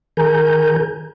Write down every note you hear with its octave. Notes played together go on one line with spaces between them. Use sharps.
D#3 G#4 A#4 G#5 A#5 G6